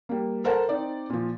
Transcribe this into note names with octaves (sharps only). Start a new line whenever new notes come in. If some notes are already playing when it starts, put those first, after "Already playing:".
G3 A#3
A4 A#4 C5 F#5 A5
C4 D#4 D5
A#2 F3